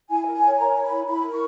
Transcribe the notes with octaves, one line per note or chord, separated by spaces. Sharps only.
E4 G#5
A#4
G#5
C#5
A#4 A#5
C#5
B5
E4
E4 B5
A#4
C#6